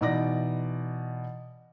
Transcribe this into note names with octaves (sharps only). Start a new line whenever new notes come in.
B2 E3 D#4 D5 D6 A#6